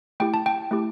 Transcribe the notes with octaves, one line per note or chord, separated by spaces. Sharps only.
A3 E4 G4 G5
A5
G5
A3 E4 G4